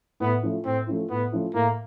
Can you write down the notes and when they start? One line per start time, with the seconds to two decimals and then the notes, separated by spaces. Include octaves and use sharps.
0.20 A2 B3
0.43 F3 A3 C#4 E4
0.65 A2 C4
0.87 F3 A3 C#4 E4
1.10 A2 B3
1.32 F3 A3 C#4 E4
1.54 A2 A#3